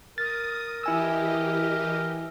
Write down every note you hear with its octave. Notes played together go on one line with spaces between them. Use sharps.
A#4 D#6 A6
E3 E4 G4 D#5 G#5 E6